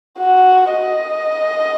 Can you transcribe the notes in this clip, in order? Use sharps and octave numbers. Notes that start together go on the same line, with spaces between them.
F#4
D#5